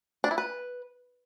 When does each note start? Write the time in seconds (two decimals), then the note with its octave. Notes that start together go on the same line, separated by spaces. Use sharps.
0.24 D4
0.31 E4
0.38 B4